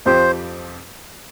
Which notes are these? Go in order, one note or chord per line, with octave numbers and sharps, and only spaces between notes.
F2 F3 C4 G4 C5